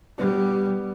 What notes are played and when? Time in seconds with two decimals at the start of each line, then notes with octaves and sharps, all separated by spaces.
0.18 G3 B3 D4